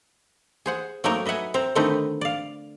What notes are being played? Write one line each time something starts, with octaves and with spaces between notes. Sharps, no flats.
G#4 C5 F#5
F#3 A3 A#3 C4 D#4 A#4
B4 D#5 E5 F#5 G#5
C4 C5 A#5
D3 D#3 A3 C4 D#4 B4
D5 F5